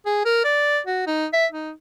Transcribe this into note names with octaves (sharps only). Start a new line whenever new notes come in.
G#4
A#4
D5
F#4
D#4
E5
D#4